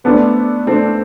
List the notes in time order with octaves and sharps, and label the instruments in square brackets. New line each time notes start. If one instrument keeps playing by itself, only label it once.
[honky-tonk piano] A3 D4 A4 C5 [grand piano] B3
[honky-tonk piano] A3 D4 A4 C5 [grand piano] C4